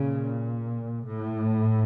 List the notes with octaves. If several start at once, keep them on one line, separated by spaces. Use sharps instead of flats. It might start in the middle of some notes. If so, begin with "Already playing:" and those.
Already playing: A#2 C#3
A2